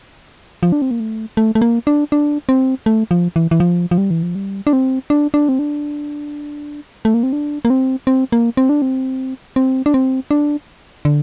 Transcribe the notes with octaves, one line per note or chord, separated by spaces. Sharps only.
F3
D4
C4
A#3
A3
A3
A3
A#3
D4
D4
C4
A3
F3
E3
E3
F3
F3
G3
E3
F3
G3
D4
C4
D4
D4
C4
D4
A3
A#3
C4
D4
A#3
C4
C4
A#3
C4
D4
C4
C4
D4
C4
D4
D3